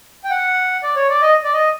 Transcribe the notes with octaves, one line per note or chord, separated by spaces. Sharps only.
G5
F#5
D5
C#5
D5
D#5
D5
D#5